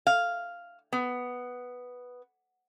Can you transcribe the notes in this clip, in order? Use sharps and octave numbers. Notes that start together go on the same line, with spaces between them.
F5
B3